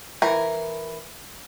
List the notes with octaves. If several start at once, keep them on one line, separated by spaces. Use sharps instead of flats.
E3 A#4